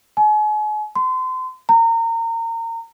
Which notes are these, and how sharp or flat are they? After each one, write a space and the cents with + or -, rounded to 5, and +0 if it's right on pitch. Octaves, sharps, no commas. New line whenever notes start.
G#5 +40
C6 -30
A#5 -30